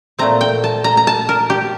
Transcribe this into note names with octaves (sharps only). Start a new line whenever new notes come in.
A#2 A3 C4 A#5
G5
A5
A#5
A#5
A5
A#4
G4